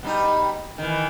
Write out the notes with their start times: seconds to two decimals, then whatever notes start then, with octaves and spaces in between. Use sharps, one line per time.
0.03 B2 G3 D#4
0.78 D#3 E3